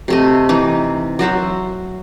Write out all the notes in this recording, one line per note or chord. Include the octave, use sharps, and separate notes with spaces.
C3 A3 D#5
E3 D#4
F#3 F#4 C5 E5